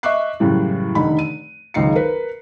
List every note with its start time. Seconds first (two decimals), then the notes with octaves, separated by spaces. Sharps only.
0.03 D#5 E5 C#6 D6 F#6 C7
0.40 F#2 A2 C#3 E3 G3
0.95 F1 D3 D#3 D#4 B5
1.19 D#7
1.74 F#1 C#2 D#3 D#4 C7 C#7
1.95 A#4 B4